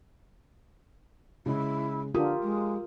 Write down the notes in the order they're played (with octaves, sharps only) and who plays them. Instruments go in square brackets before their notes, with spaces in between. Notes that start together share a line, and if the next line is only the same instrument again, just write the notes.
[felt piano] C#3 G#3 [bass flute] E4
[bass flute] D3 [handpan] F4 A#4 [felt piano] G4 D#6
[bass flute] G#3